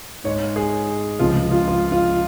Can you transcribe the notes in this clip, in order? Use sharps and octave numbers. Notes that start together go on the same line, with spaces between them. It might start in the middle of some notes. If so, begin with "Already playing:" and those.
G#2 G#3 C#5
G#4
C#2 C#3 F3 G#3 F4
F4
F4
F4